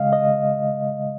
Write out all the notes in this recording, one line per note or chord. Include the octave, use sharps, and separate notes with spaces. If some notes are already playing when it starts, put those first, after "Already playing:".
Already playing: C#3 G#3 D#5 F5
D#5